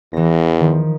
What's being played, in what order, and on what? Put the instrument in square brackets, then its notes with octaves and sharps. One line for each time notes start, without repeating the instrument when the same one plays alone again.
[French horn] E2 [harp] E3 A#6
[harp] D#3 F3